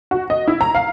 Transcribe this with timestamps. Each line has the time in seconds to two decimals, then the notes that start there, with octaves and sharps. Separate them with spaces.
0.11 F#4
0.30 D#5
0.48 E4
0.61 A#5
0.75 F5